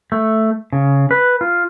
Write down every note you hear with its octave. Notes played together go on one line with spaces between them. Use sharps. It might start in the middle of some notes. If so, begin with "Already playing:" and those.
A3
C#3
B4
F4